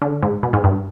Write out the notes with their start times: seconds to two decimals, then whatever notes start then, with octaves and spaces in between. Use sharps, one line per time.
0.02 D3
0.23 G#2
0.43 B2
0.53 G#2
0.64 G2